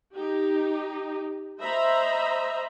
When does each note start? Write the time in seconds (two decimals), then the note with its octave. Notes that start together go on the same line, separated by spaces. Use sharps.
0.14 D#4 G4
1.61 C5 D#5 E5 A#5 B5